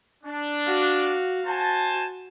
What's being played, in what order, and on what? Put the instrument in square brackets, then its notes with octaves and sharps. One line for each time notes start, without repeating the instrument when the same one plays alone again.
[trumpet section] D4
[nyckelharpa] F#4 F5
[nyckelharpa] F#4 [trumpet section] C5 G#5 A5